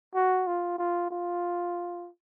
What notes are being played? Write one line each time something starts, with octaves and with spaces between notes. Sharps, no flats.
F#4
F4
F4
F4